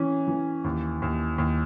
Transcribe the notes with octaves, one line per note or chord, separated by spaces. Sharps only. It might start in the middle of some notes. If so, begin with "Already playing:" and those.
Already playing: E3 C#4
E3
D#2
D#2
D#2